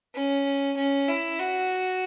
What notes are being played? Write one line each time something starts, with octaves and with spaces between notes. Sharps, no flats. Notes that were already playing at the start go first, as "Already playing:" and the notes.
C#4
C#4
E4
F#4